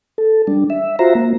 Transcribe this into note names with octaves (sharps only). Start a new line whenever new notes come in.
A4
G3 D4
E5
F4 F#4 C5 E5 A#5
A#3